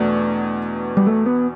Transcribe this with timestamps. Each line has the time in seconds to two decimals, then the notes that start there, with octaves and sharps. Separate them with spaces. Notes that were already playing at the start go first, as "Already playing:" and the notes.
Already playing: E2 B2 A3 D4
0.97 G3
1.07 A3
1.26 B3